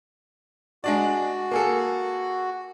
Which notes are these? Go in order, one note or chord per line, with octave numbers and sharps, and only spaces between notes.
G#3 D4 F#4 D5
A#3 G#4 A4